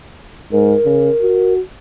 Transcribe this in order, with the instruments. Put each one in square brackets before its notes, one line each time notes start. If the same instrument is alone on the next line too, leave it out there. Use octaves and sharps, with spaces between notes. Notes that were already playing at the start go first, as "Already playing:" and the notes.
[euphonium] G#2 [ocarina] A#4
[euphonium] C#3
F#4